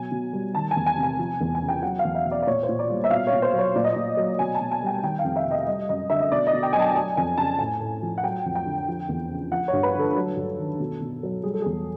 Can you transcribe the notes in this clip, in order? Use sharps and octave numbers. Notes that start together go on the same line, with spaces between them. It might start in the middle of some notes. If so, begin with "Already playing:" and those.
Already playing: B2 F#3 G#5
B2
G3
D#3 A5
G#5
E2
G#5
C3
G#5
F3
E2
G#5
C#3
G5
F#3 F#5
F5
E2
E5
B2
D5
D5
A#2 C#5
C5
A#2
D5
G3
E5
B2 F5
C#5
B2
C5
F#3
C#5
A#2 D5
D#5
A#2 D5
F#3
B2 G#5
A5
B2
G#5
G3 G5
D#3 G5
F5
F2
E5
C3
D#5
G3 D#5
F#2 D#5
D3 E5
D#5
B2 D5
D#5
B2
G5
F#3 G#5
A5
F#3 G#5
F2 G#5
C#3 A5
A2 G#5
A2
F3
F#5
F#3 G5
F2
G5
D3
F3
E2
C#3
F3 F#5
C#5
G2
B4
D3
A4
F#3
G2
D#3
B2
B2
F#3
G3 G#4
A4
E2 G#4